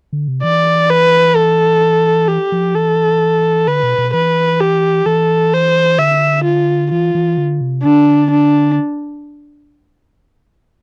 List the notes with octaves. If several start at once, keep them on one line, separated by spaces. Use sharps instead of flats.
D3
C3
E3 D5
B4
A4
G4
F3
E3 A4
D3 B4
B2
B2
E3 B4
G4
E3 A4
C5
D3 E5
F4
E3 F4
E3
D3
C3
D3 D4
D4